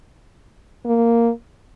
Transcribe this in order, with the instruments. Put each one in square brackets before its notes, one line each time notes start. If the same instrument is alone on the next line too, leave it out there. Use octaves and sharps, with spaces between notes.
[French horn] A#3